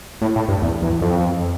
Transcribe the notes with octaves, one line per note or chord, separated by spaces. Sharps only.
A2
A2
G2
E2
E2
F2